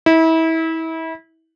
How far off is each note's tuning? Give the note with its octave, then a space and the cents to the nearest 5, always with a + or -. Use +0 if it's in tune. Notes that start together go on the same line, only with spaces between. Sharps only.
E4 -30